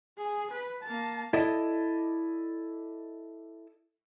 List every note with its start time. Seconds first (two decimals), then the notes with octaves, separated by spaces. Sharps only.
0.18 G#4
0.52 B4
0.83 A#3 A5
1.33 E4 A4 D5 D#5